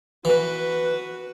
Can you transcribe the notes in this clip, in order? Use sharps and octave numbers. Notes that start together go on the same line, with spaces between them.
E3 F#4 B4